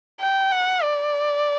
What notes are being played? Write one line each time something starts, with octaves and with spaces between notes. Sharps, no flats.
G5
F#5
D5